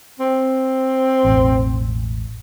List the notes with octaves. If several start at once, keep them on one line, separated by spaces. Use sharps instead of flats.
C4
E1 A1